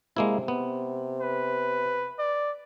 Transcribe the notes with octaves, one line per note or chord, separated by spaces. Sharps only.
C3 G#3 A#3 E4
B3
B4
D5